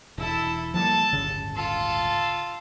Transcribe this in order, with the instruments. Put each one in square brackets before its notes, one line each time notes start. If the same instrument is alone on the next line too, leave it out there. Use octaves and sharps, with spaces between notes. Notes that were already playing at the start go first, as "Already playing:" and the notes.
[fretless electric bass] E1 [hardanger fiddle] E4 A4
[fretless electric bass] F3 G3 A#3 [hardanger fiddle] A4 A5
[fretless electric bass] D1 G1 C#3
[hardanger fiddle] F4 A4